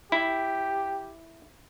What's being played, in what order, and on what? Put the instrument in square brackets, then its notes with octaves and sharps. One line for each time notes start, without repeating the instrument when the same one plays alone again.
[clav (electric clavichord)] E4 [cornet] G4